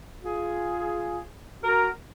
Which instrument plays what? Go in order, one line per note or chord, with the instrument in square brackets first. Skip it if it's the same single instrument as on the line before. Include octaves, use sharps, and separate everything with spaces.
[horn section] F4 G#4
F#4 A#4